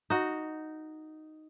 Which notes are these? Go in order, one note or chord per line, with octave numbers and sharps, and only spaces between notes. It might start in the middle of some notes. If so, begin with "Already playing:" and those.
D#4 F#4